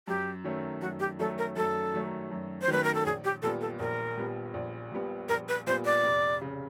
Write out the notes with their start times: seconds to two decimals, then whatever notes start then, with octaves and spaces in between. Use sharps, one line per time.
0.08 F#2 G4
0.44 D#3 F#3 A3 C#4
0.81 F#2 F#4
1.00 G4
1.19 D#3 F#3 A3 C#4 A4
1.38 A#4
1.57 F#2 A4
1.94 D#3 F#3 A3 C#4
2.31 F#2
2.62 C5
2.68 D#3 F#3 A3 C#4 B4
2.84 A#4
2.94 A4
3.06 A#1 G#4
3.24 G4
3.42 A#2 G3 B3 A4
3.61 A4
3.79 A#1 A#4
4.17 A#2 G3 B3
4.54 A#1
4.92 A#2 G3 B3
5.29 A#1 A#4
5.48 B4
5.67 A#2 G3 B3 C5
5.85 D5
6.03 F1
6.41 C#3